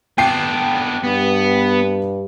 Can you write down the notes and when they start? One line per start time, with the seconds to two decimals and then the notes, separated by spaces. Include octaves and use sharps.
0.18 B3 D4 G5 C7
1.04 G2 B3